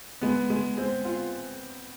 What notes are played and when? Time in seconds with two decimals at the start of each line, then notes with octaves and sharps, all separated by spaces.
0.21 G#3 B3
0.50 G#3
0.77 G#3 C4
1.05 F4